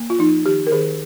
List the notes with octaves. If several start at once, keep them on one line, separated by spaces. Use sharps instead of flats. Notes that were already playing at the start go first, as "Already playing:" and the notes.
Already playing: A#3
F4
F3 D#4
D#3 G4
A#4
D#3 G#4